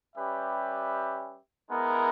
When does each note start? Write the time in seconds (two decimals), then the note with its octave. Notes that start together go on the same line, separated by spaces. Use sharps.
0.15 G3 C#4 G4 B4 E5
1.69 G#3 B3 E4 A#4